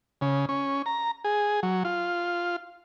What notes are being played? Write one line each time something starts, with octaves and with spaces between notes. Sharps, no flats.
C#3
C#4
A#5
G#4
F#3
F4